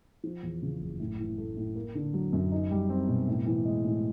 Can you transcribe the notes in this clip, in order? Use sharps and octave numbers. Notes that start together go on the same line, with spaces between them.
F3
E2
C#3
F#1
A2
E3
A3
A2
A#3
D3
F#3
F#2
D#4
G3
C4
B2
A2
E3
G#3
A2